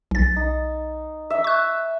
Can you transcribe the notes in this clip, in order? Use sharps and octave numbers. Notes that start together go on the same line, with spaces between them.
B1 A6
D#4
E5
C#6 F#6